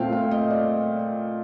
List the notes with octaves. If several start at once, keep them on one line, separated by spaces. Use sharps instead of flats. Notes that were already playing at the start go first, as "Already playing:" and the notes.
Already playing: A#2 A3 C4 F5 G5
F5
D#5
D5